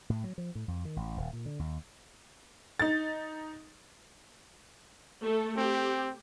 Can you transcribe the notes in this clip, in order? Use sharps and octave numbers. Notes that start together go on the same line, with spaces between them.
A2
F#3
F3
A2
F2
D#3
A1
D#1
A#2
D3
D#2
D#4 A6
A3 A4
C4 G4